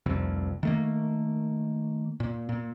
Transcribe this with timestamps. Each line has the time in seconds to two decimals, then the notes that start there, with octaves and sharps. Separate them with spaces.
0.06 F1 C2 F2
0.63 D#3 A3 A#3
2.20 A#2
2.49 A#2